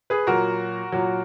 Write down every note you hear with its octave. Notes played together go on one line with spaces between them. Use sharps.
G#4 B4
A#2 F#3 F#4 A#4
A#2 F#3